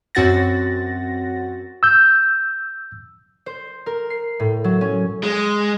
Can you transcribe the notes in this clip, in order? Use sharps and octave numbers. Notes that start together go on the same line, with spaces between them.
F#2 C4 F#4 F#5 A6 A#6
E6 G6
C5
A#4
C7
A2
F#3
C#4
G#3